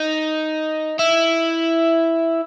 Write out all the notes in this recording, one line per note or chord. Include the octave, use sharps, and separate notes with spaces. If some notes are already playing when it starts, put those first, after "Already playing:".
Already playing: D#4
E4